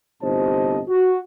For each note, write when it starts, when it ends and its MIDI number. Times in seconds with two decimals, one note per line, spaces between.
0.22 0.80 31
0.22 0.80 45
0.22 0.80 48
0.22 0.80 72
0.22 0.80 75
0.22 0.80 81
0.87 1.18 66